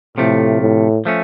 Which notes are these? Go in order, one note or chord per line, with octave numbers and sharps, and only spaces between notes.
A2 C3 F3 A3
A2
F3 A3 C#4